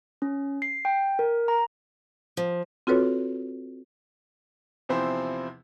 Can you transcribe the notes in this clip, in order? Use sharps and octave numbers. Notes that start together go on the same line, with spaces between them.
C#4
C7
G5
A#4
A#5
F3
C4 F4 F#4 A4 B4 C#5
E2 C3 F3 C4 E4 C5